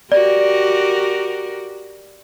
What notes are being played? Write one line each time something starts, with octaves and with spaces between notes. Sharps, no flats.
F#4 G4 A#4 D5